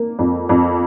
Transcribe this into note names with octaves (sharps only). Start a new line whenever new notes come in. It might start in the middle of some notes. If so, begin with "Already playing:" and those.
Already playing: A#3
F2
F2